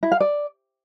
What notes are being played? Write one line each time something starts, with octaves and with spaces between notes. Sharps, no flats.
E4
F5
D5